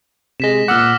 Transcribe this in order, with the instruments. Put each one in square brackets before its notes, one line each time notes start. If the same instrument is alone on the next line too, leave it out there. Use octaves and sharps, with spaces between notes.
[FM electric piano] C3 G#3 [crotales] A#6 B6 E7
[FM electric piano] A#2 F#5 [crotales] D6 E6 F6